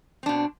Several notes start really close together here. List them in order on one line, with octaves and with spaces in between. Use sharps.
C4 D4 B2